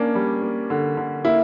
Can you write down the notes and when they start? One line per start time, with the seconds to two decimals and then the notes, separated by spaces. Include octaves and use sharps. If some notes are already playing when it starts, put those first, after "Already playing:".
Already playing: A#3 C#4 D4
0.15 G3
0.42 A#3
0.70 D3
0.97 D3
1.24 A#3 E4